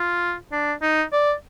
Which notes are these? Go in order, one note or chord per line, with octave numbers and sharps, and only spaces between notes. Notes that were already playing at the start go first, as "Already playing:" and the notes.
Already playing: F4
D4
D#4
D5